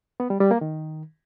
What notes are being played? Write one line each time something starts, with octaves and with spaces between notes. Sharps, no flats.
B3
G3
G3
A#3
D#3